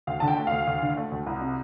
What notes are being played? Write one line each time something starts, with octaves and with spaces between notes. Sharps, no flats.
D2 F5
D3 A5
G5
A3
D2 F5
D2
D3
A3
D2
C2
C3